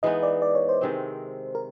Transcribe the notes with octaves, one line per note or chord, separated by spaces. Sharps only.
E3 G#3 B3 D#4 D#5
D5
D5
C#5
C5
C3 D#3 G#3 C4
A#4